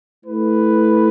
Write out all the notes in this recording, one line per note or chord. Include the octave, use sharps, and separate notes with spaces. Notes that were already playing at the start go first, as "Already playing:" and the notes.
A3 E4 B4